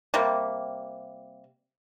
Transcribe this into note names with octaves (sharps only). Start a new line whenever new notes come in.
C3 G3 A#3